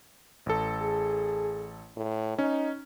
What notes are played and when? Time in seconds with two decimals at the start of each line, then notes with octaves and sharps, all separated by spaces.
0.46 A1 A4
0.82 G#4
1.97 A2
2.39 C#4 D#4